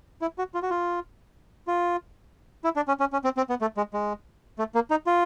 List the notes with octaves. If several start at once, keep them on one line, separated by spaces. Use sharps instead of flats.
E4
F#4
F4
F#4
F4
F4
E4
D4
C#4
C#4
C#4
C4
C4
B3
A3
G#3
G#3
A3
A#3
D#4
F4